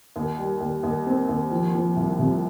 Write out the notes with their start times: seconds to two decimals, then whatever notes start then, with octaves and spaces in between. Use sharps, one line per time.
0.16 D#2
0.39 G3
0.61 D#2
0.83 D#2
1.07 C4
1.29 D#2
1.51 F3
1.74 F3
1.96 C2
2.19 C3